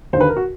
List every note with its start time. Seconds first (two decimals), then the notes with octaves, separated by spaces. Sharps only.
0.13 D#2 C5
0.16 D3 B4
0.29 A#4
0.37 F#4